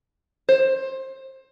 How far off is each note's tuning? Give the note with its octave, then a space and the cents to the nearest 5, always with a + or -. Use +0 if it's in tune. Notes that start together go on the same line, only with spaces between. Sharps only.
C5 +20